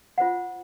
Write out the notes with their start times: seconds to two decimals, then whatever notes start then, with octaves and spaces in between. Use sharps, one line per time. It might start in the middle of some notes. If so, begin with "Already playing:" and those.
0.18 F4 C5 F#5